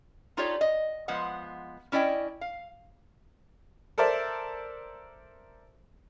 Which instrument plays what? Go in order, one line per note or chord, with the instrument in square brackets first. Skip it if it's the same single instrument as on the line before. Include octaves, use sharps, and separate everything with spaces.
[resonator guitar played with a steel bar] D#4 F4 G4 A4 C#5 D5
D#5
F3 G#3 B3 F#5
C#4 E4 D5 D#5 G5
F5
[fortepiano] A4 A#4 C5 D5 E5